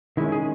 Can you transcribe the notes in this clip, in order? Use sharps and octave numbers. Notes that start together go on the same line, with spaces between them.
D#3 G#3 C#4 E4
G#4